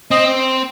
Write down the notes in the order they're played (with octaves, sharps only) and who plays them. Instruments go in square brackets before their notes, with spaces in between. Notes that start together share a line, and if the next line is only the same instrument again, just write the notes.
[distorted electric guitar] C4 [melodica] D#5